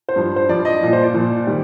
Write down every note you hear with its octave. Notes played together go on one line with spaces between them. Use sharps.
C5
G2 F3
C5
G2 F3 D5
D#5
A#2 F3
C5
D5
A#2 F3
D#3 G3